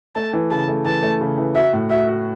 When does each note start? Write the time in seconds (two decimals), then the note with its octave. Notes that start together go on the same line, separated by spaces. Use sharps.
0.15 A3 A5
0.33 E3
0.51 C#3 A5
0.68 A3
0.85 E3 A5
1.03 A3
1.21 C#3
1.38 E3
1.55 F#4 E5
1.73 A2
1.90 F#4 E5
2.08 F#4